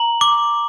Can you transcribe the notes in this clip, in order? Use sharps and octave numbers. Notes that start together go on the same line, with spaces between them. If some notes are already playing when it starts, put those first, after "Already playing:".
Already playing: A#5 F#7
D6